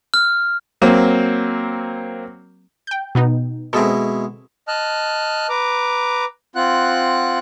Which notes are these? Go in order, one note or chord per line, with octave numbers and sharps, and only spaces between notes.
F6
F#3 A#3 C4
G5 G6
B2 B3 D#4
B2 G#3 C4 E4 A4
D#5 A5 F6 F#6
B4 A#5 D6
C4 F4 F#5 F#6